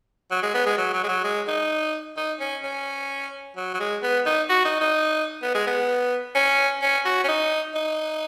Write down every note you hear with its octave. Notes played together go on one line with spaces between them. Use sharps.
F#3
G#3
B3
G#3
F#3
F#3
G#3
F#3
G#3
D#4
D#4
C#4
C#4
F#3
F#3
G#3
B3
D#4
F#4
D#4
D#4
B3
G#3
B3
C#4
C#4
F#4
C#4
D#4
D#4